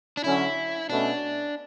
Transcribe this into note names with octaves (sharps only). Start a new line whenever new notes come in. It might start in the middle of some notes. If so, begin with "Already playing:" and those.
D4
D3 F#3 C#4 E4
B2 A3 C#4 D4